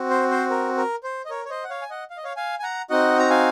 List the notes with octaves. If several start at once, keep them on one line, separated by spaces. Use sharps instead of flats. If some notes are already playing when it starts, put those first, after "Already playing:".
Already playing: C4 F#4
C5
C5
A#4
A#4
C5
D#5
A#4 C#5
C#5
C5 D#5
F#5
C#5 F5
G#5
D#5 F#5
F5
D#5
C#5 F5
F5 G#5
G#5
F#5 A#5
C4 D#4 F#4 D#5 F#5
A#5
F5 G#5